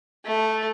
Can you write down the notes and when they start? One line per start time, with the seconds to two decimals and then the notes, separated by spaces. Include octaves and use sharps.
0.24 A3